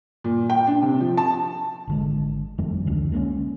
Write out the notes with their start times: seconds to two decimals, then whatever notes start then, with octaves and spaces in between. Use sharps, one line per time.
0.24 A#2
0.50 G5
0.67 D4
0.82 C3
1.00 F3
1.17 A5
1.87 G#1 D3 G#3
2.58 F2 D#3 G3 A3
2.86 C#2 D3 E3
3.12 G#3 A#3 C4 C#4